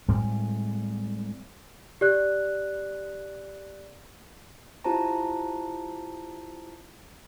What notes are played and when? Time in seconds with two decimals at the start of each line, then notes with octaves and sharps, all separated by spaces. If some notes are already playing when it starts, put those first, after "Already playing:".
0.09 A2 G3 G#3 C4
2.01 G4 D5 F#6
4.84 E4 F4 G4 C5 A5 A#5